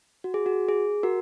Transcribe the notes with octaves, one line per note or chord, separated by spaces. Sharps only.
F#4
G#4
F#4
G#4
F#4 A#4